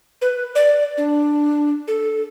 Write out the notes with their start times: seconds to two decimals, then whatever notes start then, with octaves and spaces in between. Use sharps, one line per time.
0.21 B4
0.55 D5
0.97 D4
1.88 A4